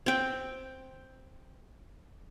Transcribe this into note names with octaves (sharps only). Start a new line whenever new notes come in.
C4 G5